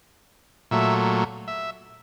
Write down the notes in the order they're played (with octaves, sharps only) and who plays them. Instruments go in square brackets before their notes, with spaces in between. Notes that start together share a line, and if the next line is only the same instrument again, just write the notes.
[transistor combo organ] A#2 F#3 A3 E5
E5